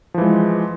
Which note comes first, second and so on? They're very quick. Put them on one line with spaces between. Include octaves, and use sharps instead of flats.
F3 E3 G#3